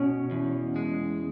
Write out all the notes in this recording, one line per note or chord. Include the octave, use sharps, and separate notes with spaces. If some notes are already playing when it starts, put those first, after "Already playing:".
Already playing: B2 C#4
E2
G#3